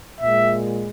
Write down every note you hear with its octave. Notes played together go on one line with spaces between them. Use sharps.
A#2 G#3 E5